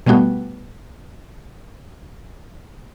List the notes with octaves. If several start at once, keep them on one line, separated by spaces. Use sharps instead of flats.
B2 G3 A3 B3 F#4